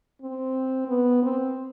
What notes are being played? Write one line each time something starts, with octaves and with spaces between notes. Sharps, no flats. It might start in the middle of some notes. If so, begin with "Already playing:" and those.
C4
B3
C4